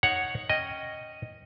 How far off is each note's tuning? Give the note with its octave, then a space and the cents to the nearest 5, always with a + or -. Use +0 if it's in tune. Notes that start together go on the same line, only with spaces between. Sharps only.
D#4 +0 C#5 +0 F#5 +0
C#4 +0 D#5 +0 G5 +0